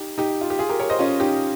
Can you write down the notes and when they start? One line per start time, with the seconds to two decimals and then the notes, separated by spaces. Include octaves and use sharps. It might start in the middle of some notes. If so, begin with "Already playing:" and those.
Already playing: D#4 G4
0.18 D#4 G4
0.41 F4
0.50 G4
0.59 F4 G#4
0.69 G4 A#4
0.79 A#4 C#5
0.89 C5 D#5
0.99 C#4 F4
1.20 D#4 G4